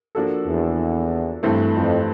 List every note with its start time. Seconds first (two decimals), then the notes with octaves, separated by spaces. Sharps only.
0.15 F3 A#3 D4 F#4 A4
0.47 E2
1.43 G2 E3 A3 C4
1.75 F2